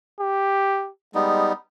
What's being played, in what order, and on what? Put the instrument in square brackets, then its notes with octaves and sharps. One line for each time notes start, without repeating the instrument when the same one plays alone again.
[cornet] G4
[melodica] G3 B3 D#4 [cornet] G#3